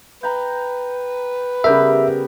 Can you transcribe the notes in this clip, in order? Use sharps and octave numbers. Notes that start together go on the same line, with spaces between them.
B4 G5 A#5
C#3 G3 B3 G4 A#4 E5